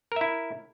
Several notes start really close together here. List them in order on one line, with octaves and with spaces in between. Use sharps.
A#4 E5 E4